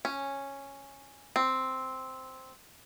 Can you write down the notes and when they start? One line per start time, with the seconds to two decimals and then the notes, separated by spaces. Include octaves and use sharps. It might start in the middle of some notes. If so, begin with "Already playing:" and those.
0.05 C#4
1.36 C4